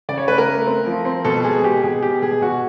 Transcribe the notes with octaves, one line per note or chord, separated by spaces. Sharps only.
C#3 D5
C#5
A3 B4
A#4
A3
C4
F3
C4
B2 A4
G#3 G#4
B2 G4
B2 G#4
B3 G4
B2 G#4
B2 F#4